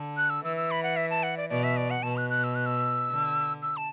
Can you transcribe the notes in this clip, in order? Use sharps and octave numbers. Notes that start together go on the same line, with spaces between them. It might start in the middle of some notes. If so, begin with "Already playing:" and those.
Already playing: D3
F#6
E6
E3 E6
E6
B5
F#5
E5
A5
F#5
D5
B2 D5
E5
D5
F#5
B2 A5
F#6
F#6
E6
F#6
E6
D3
E6
A5